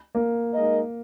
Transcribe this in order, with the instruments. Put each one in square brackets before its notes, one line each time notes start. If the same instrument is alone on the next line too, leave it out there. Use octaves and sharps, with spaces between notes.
[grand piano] A#3
[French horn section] G#3 D#4 A#4 D#5